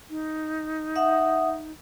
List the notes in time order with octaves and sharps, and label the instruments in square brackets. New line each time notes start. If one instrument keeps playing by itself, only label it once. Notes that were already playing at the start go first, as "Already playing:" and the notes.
[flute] D#4
[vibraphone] E5 F#5 D#6